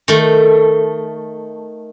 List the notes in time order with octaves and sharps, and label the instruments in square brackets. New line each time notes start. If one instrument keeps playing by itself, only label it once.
[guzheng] D#3 A3